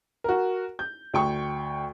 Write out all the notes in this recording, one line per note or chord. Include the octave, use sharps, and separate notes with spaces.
F#4 A#4
G6
D2 G5 C#6